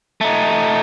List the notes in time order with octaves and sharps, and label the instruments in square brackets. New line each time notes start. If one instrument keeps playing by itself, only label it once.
[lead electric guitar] A3 D#4